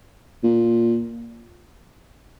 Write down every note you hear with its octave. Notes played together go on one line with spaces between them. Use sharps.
A#2